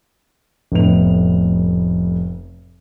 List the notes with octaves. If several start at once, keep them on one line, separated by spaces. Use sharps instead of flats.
F1 A2 B3 F7